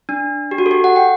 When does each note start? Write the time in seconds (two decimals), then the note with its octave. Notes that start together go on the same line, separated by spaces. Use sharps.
0.09 D4
0.51 G4
0.58 F#4
0.66 A4
0.71 G4
0.84 F#5
0.96 G5